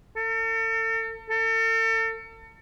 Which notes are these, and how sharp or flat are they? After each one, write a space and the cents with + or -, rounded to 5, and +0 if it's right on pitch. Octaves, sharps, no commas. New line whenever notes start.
A4 +40
A4 +35